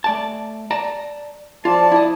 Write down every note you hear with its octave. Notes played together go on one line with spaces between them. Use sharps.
A3 D5 A5
D5 A5 A#5
F3 F4 D5 A5
E4 D#5